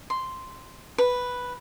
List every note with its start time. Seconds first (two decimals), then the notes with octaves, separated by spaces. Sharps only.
0.10 C6
0.98 B4